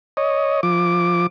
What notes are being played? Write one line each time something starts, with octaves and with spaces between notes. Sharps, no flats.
C#5 D#5
F3 D6